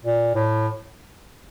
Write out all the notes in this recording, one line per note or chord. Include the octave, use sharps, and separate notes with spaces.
A#2
A2